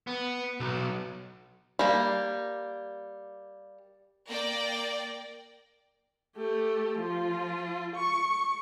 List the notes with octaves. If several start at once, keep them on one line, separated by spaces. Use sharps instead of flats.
B3
B1
G3 A#3
A#3 D5 G5 A#6
A3 G4
F3 F4
C#6